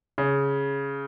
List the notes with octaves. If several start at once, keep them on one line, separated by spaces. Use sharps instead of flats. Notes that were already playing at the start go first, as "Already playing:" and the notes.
C#3